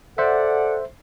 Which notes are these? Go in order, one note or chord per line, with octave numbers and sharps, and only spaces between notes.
A4 C5 D5 E5 F#5